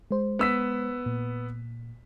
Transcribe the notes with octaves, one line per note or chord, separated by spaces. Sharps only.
G#3 C5
B3 E6 B6
A#2